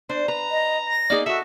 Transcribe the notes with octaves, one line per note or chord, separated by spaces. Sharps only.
D4 C5
B4 A#5
D#5
A#6
A#3 D#4 G#4 D5
F#4 A4 E5